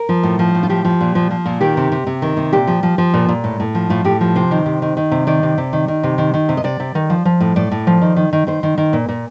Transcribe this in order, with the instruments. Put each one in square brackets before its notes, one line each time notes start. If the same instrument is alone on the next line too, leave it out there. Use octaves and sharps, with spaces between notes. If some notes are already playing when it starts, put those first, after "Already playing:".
Already playing: [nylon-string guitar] A#4
F3
A2
F3
A2
F4
F3 G4
F3
A#2
F3
F3
A#2
D#3 G4
C3
C3
C3
D#3
C3
A#2 G4
F3
F3
F3
A#2
A#2
A2
A2
F3
A2 F4
A2 G4
F3
C3 C5
D#3
C3
D#3
D#3
C3
D#3 D5
C3
C3
D#3
D#3
C3
D#3
D#3
C3
D#5
C3 D5
C3
D#3
F3
F3
A2
A2 D5
A2
F3
D#3
D#3
D#3
D#3 C5
D#3
D#3
A#2
A#2